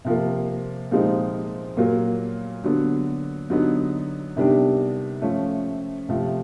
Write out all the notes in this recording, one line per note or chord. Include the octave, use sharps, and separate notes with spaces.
C3 F3 A#3
A#2 F3 G#3 C4 D#4
A#2 F#3 A#3
D3 F#3 B3
D3 F#3 B3 D#4
C3 D#3 G3 B3 D4
F3 A3 C#4
C3 F3 A3